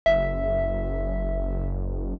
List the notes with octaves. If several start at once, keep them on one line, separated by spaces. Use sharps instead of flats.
F#1 E5